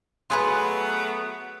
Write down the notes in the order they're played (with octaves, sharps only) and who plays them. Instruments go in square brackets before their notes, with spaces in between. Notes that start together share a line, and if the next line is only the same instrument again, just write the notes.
[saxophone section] F#3 A3 B3 [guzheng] F4 G#4 B4